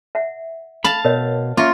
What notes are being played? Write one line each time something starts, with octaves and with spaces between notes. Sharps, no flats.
E5 F#5
F5 A5 B5
B2 A#4 C#5 D#5
A#3 C#4 F4 E5 C#6 D6